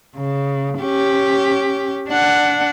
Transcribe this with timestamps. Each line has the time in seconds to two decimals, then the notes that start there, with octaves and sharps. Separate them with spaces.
0.16 C#3
0.81 C#4 G4
2.10 D4 F#5